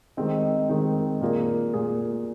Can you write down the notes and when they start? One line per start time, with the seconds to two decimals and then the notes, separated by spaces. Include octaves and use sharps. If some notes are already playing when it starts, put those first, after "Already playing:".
0.17 D#3 G#3 C4 D#4
0.69 D#3 G#3 C4 D#4
1.21 A#2 A#3 F4 G#4
1.74 A#2 A#3 F4 G#4